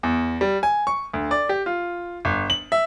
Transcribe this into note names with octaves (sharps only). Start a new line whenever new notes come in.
E2
G3
G#5
C#6
D2
D5
G4
F4
G1
F#7
E5